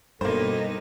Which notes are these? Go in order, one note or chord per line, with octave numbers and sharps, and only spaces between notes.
G2 B2 A#3 B3 D#4 A4 C5